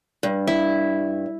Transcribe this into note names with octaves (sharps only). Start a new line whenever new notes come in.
G2
E4